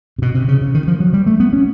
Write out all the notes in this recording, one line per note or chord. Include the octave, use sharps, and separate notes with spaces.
C3
B2
C3
C#3
C#3
D#3
F3
F#3
G3
A3
B3
C#4